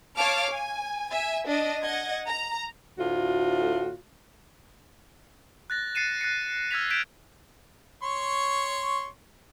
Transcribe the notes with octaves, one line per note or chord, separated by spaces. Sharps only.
C#5 F5 A5 D6 F6
G#5
E5 G#5
D4 D#5
D#5 F#5 G#6
A#5
D2 A2 F4 F#4
F#6 A6 A#6
A6 C7 C#7 D#7 E7
F#6 A6 A#6 C#7
E6 F6 G#6 A#6 B6 F7
G6 G#6 B6 D7 E7
C#5 C6 C#6